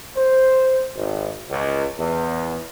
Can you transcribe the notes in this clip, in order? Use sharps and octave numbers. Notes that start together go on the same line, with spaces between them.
C5
G#1
C#2
E2